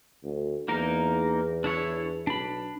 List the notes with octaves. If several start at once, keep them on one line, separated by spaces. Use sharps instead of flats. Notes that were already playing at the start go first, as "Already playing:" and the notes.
D2
E2 A#3 D#4 A#4
D4 E4 C#5
B1 D4 B5